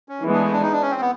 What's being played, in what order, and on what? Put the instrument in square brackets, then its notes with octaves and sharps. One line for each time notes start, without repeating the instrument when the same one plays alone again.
[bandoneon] C#4
[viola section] E3 G#3 B3
[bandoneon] D4
A3
D4
D#4
D4
C#4
C4
B3